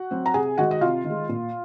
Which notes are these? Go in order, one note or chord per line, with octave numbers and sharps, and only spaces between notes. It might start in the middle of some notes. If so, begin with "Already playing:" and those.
Already playing: F#4 F#5
F#3 C4
A#5
C3 G#4 G#5
D#3 G#3 F#4 F#5
D#5
C3 F4 F5
D#3
G#3
A#2